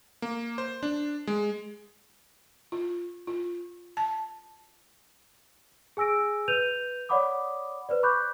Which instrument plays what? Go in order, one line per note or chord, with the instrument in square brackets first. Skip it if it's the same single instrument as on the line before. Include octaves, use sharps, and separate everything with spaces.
[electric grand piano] A#3
C5
D4
G#3
[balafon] F4
F4
A5
[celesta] G#4 G#5 E6 A#6 D7
B4 G6 D#7 F7
C#5 D5 F#5 B5 D6 D#6
B4 C5 D5
B5 C#6 D6 F#6 G6